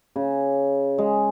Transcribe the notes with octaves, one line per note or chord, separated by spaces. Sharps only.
C#3
G#3